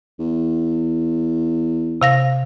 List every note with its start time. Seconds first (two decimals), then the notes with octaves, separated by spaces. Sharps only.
0.19 E2
2.02 C3 F5 A#6